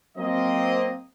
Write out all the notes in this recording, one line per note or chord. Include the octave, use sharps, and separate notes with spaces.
F#3 A#3 C4 D#5